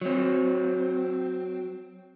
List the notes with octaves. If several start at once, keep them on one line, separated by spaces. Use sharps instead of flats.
F#3 C4